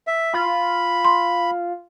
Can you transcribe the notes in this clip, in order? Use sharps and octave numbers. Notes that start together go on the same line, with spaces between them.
E5
F4 B5
C6